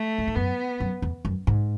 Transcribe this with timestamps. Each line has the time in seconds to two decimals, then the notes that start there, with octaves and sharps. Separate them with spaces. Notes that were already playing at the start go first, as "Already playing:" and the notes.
Already playing: A3
0.18 A2
0.27 G#2
0.35 F#2 B3
0.80 F#2
1.02 E2
1.25 F#2
1.47 G#2